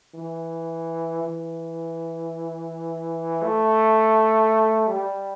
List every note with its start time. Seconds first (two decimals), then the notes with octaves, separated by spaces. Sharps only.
0.14 E3
1.23 E3
3.42 A3
4.87 G3